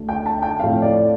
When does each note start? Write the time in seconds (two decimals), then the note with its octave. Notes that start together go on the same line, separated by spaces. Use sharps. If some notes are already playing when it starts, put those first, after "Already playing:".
Already playing: D2 D3 A3
0.09 G5
0.26 A5
0.43 G5
0.60 A2 F3 A3 C4 F5
0.82 D5